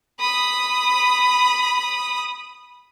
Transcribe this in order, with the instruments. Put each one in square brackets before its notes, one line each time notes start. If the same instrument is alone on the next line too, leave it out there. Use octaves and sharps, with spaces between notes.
[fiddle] B5 D#6